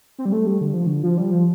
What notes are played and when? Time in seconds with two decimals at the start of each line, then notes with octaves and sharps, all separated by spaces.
0.18 C4
0.25 G3
0.33 A3
0.46 G3
0.61 D3
0.74 F3
0.87 D3
1.03 F3
1.18 G3
1.31 F3